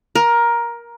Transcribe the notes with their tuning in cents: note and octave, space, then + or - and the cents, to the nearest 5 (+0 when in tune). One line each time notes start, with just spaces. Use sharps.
A#4 +15